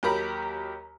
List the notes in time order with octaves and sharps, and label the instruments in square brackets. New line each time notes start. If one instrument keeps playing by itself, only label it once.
[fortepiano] D#2 F#3 G4 A#4 B5